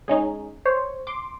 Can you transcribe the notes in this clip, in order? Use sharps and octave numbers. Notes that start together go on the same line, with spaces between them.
G#3 C#4 D#4 G#4
C5 C#5
C6 D6